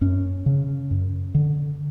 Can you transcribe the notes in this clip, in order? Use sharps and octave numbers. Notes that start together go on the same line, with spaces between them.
F#2 C#4
C#3
F#2
D3